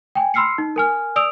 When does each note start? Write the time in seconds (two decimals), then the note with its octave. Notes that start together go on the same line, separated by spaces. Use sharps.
0.15 G5 G#5
0.34 B5 C6 E6 F6 C7 C#7
0.58 D#4
0.76 A#4 G#5 F6
1.16 D5 D#6 E6 D7 F7